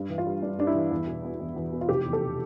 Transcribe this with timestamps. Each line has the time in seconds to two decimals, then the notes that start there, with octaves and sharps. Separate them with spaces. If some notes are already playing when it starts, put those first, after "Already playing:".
Already playing: G2
0.10 E3
0.18 F4
0.26 G3
0.42 G2 D4
0.58 G2 D4
0.67 E4
0.75 E3
0.91 E2
1.07 B2
1.24 B3
1.40 E2
1.56 E2
1.72 B2
1.81 F4
1.89 F1 G4
2.05 E2
2.13 A4
2.21 B2